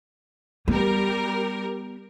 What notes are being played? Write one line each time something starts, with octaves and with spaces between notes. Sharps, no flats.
G3 B3 A#4